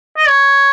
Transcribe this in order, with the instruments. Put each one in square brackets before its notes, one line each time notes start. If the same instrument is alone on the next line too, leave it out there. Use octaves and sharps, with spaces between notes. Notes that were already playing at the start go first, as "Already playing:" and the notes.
[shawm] D#5
C#5